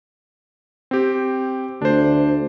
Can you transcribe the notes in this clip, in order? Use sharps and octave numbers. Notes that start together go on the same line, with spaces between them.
C4 G4
D2 D4 C5